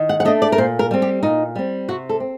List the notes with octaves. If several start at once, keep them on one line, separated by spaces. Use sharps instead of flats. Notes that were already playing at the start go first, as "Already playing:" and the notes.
Already playing: D#3
F#5
F#5
A3 D4 D#5
D5
A#4
A#2 C5
A#4
G3 C4
G4
A#2 D#4
G3 C4
C3 F#4
A4
C4